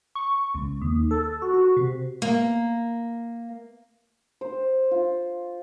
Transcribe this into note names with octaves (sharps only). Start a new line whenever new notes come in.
C#6
C#2
D#2
A4
F#4
F#4
C3
A#3
C5
F4